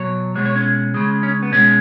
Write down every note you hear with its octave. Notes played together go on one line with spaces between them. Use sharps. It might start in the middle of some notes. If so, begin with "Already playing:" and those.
Already playing: B2 F#3 C#5
B2 G#3 C#5
C#5
C#4
C#3 G#3
C#4
B3
B2 G#3 C#4